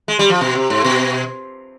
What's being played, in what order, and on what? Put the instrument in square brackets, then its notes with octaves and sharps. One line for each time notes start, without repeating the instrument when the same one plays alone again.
[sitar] G#3
G3
F3
B2
C3
G#2
B2